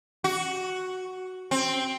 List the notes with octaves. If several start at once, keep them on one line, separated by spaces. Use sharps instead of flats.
F#4
C4